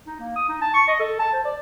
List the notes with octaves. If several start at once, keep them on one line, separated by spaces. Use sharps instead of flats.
D#4
A#3
D#6
D#4
A5
C#6
D#5
A4
A5
C5
D5